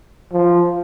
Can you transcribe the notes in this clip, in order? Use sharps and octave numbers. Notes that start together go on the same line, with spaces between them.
F3